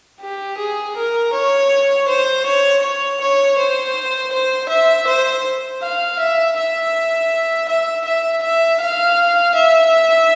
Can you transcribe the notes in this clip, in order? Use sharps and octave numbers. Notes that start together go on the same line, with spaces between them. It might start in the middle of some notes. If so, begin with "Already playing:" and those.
G4
G#4
A#4
C#5
C5
C#5
C#5
C#5
C5
C5
E5
C5
F5
E5
E5
E5
E5
E5
F5
E5